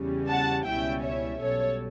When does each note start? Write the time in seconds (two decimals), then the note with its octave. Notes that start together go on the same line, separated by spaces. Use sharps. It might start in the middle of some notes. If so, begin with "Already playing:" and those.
Already playing: E2 C#3 E3 G3 C#4
0.29 F#5 A5
0.66 C#2 B2 G3 C#4 E4 E5 G5
1.03 C#5 E5
1.40 B1 B2 G3 A4 C#5